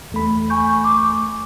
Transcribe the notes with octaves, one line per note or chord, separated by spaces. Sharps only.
E2 A3 B5
G#5 C#6 G6
D6